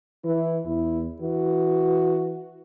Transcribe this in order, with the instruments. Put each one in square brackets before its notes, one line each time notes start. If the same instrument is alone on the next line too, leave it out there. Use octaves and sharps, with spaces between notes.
[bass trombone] E3 [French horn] E4
[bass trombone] E2 [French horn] E4
[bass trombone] E3 [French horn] F#4